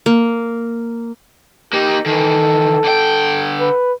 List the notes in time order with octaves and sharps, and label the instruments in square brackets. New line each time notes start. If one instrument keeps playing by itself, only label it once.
[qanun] A#3
[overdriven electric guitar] A#3 D#4 [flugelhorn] G4
[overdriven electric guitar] D#3 E3 [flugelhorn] A4
[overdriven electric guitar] D3 G5
[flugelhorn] B4